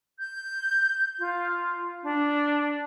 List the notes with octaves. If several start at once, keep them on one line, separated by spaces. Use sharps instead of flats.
G6
F4
D4